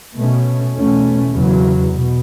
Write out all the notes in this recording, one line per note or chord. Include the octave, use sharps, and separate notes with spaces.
B2 A3 C#4
E2 B2 A3 C#4
E2 C#3 F#3
B2